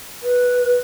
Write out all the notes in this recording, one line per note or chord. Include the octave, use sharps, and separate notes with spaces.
B4